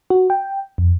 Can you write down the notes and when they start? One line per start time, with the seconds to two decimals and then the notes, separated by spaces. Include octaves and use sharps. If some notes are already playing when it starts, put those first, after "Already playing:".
0.10 F#4
0.30 G5
0.78 F2